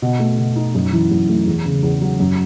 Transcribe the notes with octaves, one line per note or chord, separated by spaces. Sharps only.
B2
A3
B2
D#4
F#2
E3
F#2
A3
E2
C#3
E2
F#3
F#2